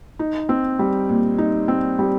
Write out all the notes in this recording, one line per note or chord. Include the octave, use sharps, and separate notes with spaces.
D#4
C4
G3
A#2
D#4
C4
G3